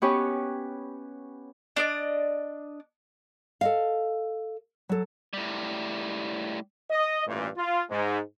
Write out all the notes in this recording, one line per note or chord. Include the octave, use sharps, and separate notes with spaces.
B3 C#4 G4 B4 C#5
D4 D5 D#5
A4 D#5 F5
F#3 A4
A2 G3
D#5
A1 G2 A#2 E3
F4
G#2